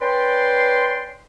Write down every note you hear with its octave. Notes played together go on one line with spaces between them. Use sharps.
C#4 B4 D5 G5 C6